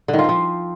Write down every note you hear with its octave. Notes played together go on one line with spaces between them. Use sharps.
D3
D#3
F4
C4
F3